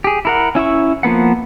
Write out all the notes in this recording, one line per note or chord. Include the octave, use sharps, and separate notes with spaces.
G4 G#4
E4 A#4 F#5
C#4 E4 E5 C#6
F3 A#3 B3 F#5